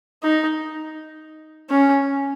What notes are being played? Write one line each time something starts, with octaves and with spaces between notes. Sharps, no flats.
D#4
C#4